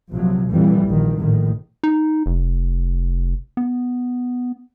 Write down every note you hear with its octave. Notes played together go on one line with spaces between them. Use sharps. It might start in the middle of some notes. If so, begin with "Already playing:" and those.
A#1 C3 F3 F#3
F2 A#2 E3 G3
A#1 D#3
A#1 A2 D#3
D#4
F1
B3